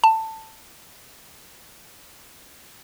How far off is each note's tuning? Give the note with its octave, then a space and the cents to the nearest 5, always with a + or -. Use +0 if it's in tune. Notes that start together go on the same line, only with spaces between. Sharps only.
A5 +15